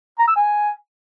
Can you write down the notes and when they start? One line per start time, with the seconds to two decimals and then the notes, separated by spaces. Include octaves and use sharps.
0.19 A#5
0.27 E6
0.36 G#5